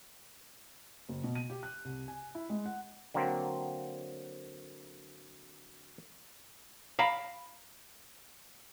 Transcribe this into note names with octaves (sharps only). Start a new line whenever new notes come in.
F#1
B2
D#7
G4
F#6
C2
G#5
E4
G#3
F#5
D3 F#3 A#3 C4
F5 A#5 B5